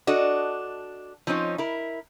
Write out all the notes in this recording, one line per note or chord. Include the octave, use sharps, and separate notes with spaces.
D4 F#4 A4 D#5
F3 C4 C#4 D#4 C#5
E4 A#4